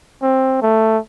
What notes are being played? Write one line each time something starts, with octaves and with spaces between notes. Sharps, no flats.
C4
A3